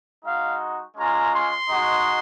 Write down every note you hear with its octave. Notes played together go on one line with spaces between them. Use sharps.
G#3 D#4 F#4 F5
G#3 C#4 F4 A#5
C6
G#3 D#4 F#4